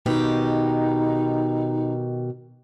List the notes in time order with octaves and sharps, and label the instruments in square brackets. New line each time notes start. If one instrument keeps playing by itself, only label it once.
[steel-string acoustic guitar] B2 D#3 G4 [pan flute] D#4